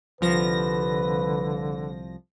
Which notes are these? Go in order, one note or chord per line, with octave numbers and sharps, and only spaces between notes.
C2 D3 F3 B4 A#6